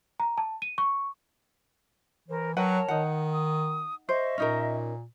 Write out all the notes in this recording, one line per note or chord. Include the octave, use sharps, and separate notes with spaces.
A#5
A5
D#7
C#6
E3 A#4 C5
F#3 A#4 B4 C#5 F#5 G5 A5
D#3 D#4 F#5
D#6
C5 D#5 E5 C#6
A#2 C#4 D#4 A#4